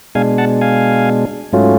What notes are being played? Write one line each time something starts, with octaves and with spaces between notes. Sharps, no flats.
B2 G#3 D4 F5 G#5
F#5 A5
F5 G#5
G#2 F#3 A3 C#4 F4